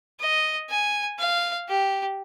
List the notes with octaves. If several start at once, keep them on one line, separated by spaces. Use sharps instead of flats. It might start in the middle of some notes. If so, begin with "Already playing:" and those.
D#5
G#5
F5
G4